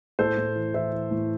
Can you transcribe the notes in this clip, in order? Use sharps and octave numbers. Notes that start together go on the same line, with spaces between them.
A2 A4 C5
A2
E3
E3 C5 E5
E3
A2